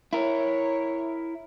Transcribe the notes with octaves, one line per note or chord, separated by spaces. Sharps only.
E4 A#4 C#5